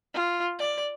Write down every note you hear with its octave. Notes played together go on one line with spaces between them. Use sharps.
F4
D5